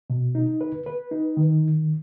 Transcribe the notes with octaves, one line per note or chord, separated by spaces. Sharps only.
B2
D#4
B4
B4
D#4
D#3